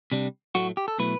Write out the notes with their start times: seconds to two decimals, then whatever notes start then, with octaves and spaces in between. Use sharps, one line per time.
0.12 C3 G3 D4
0.55 A2 F#3 A3 F#4
0.77 G4
0.88 A4
0.98 B2 F#3 A3 E4 B4